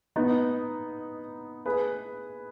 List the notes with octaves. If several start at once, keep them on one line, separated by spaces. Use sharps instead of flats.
B3 D#4
G#4 B4